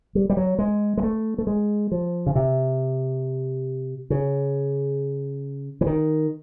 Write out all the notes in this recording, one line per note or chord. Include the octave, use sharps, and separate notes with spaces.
G3
G3
F#3
G#3
G#3
A3
A3
G#3
F3
C#3
C3
C#3
E3
D#3